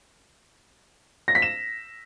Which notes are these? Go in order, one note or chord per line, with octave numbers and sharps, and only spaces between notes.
A#6
B6
E7